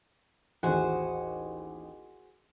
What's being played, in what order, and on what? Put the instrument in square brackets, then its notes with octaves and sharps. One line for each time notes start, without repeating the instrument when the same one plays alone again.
[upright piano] A1 D#2 [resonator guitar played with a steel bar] F#4 G#4 C5